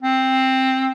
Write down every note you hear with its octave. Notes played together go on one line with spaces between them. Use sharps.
C4